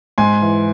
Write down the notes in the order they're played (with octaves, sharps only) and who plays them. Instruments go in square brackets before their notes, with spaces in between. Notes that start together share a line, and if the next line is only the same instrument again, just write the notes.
[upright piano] G#2 G#5 C6
E3